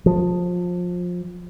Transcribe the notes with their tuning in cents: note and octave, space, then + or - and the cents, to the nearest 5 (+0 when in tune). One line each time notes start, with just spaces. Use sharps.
F3 +25